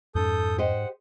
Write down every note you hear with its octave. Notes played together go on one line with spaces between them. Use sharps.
F2 G#2 A#3 C#4 A4 D#6 G6
G4 C5 D#5 F#5